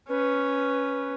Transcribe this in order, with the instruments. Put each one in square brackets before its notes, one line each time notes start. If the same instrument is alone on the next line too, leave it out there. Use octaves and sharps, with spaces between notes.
[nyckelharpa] C#4 [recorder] B4